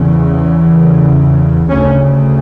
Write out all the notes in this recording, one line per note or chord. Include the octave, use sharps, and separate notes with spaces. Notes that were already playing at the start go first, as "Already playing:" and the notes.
Already playing: E2 C#3
D2 C#3 C#4